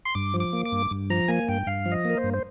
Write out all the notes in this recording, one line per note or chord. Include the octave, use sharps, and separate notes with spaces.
C6
G2 D6
F3
D6
A#3
D6
G2
G2
F3 A#5
A#3 G#5
G2 G5
G2 F5
F3
D#5
A#3
A#4
C5
G2
C5